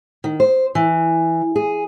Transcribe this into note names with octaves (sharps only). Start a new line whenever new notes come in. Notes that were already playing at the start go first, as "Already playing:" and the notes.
D#3
C5
E3
G#4